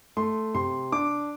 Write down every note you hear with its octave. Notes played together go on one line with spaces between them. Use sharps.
A3 C6
C3 C6
D4 D6